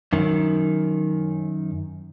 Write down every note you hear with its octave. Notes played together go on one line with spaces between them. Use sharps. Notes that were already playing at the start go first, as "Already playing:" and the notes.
F#2 D#3